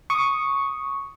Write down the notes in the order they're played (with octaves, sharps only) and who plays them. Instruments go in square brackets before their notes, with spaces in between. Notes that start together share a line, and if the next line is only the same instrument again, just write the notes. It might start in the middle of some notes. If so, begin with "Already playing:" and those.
[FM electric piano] C#6 D#6